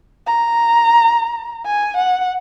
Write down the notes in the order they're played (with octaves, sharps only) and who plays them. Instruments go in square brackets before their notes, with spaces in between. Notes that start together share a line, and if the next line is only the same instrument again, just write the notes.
[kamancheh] A#5
G#5
F#5